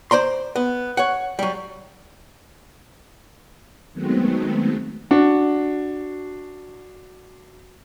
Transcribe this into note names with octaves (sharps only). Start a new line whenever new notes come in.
C5 D5 A#5 C6
B3
C#5 F#5
F#3 G3
D#3 F#3 G#3 A3 B3 C4
D4 F#4